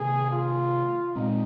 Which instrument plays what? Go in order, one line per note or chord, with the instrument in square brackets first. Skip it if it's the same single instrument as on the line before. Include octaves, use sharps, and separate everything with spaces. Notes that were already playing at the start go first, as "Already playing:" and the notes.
Already playing: [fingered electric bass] C3 D#3 A#3 [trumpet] G#4
[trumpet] F4
[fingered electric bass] A#2 G#3 C4 [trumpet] D#4